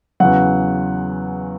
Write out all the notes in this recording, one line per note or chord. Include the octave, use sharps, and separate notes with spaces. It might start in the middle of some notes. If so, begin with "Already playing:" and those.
E2 C#3 F#3 F#5